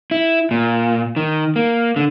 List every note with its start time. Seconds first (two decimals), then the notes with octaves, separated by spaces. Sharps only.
0.11 E4
0.51 A#2
1.16 D#3
1.56 A#3
1.96 D3